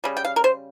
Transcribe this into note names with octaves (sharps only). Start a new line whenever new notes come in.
C#3 G3
G5
F5
A#4
C5